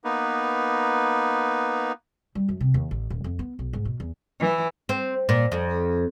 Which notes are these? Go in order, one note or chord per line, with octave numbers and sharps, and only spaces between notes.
A#3 B3 D#4 B4
G3
F#2
C3
D#2
A1
D#1
F2
B3
B1
G#2
B2
E2
E3
C4
A#2
F2